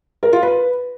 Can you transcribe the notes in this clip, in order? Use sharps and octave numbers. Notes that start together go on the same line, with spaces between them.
A#4
F4
B4